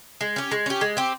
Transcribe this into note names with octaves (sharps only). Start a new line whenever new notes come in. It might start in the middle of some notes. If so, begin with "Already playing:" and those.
G#3
C#4 G4
G#3
C#4 G4
G#3
C4 G4